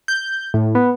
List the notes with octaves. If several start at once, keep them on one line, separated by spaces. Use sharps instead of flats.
G6
A2
B3